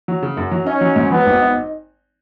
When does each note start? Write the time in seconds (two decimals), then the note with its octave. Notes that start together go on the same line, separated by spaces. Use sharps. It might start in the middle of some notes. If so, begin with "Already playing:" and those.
0.08 F#3
0.23 C#3
0.37 F#2
0.52 F#3
0.66 C#4 D#4
0.81 F#3
0.96 G#2
1.11 F#3 B3
1.27 G#1
1.41 D#4